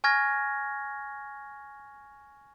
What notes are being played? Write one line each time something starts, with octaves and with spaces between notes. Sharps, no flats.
G#5 C#6 F6 G#6 A#6